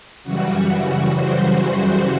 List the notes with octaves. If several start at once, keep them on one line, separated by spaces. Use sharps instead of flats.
F#2 C#3 E3 G3 F#4
C5